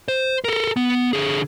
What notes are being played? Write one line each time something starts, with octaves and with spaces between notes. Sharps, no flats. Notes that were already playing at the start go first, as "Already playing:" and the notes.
C5
A4 A#4
B3
D3 G#4